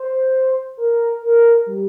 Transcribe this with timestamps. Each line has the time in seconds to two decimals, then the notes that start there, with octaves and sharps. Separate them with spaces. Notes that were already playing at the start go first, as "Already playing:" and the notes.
Already playing: C5
0.77 A#4
1.22 A#4
1.66 G3